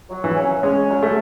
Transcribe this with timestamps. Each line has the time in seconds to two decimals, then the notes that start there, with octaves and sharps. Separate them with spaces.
0.10 F#3
0.24 E3
0.37 C#4
0.63 G#3 C#4
0.89 F#3
1.03 A3